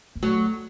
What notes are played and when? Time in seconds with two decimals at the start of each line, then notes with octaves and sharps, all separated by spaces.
0.15 A#3
0.22 F#3 A3